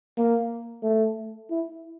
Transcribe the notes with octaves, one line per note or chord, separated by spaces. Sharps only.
A#3
A3
E4